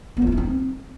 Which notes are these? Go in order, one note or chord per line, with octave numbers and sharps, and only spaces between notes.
B3
F3
E4
D#4
C4